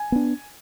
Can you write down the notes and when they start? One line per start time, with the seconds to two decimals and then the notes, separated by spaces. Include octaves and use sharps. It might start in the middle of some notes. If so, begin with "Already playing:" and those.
Already playing: G#5
0.12 B3 D4